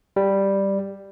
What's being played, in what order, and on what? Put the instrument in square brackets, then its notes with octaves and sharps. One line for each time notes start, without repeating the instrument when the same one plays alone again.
[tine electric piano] G3